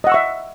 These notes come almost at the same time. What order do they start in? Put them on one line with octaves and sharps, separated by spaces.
D#5 F#5 E6 C#6 E5